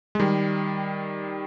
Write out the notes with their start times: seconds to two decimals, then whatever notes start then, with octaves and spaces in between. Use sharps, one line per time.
0.15 G#3
0.20 D#3 G3